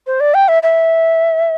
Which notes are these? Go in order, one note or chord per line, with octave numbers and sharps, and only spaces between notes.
C5
D5
G5
E5
E5